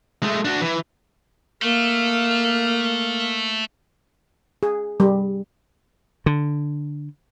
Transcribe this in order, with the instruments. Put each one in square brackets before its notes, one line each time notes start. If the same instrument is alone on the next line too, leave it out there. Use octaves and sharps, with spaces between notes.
[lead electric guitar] G#3 A3
D4 F#4
E3
[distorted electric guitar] A3 [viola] A#3 F5
[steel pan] G#4
G3
[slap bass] D3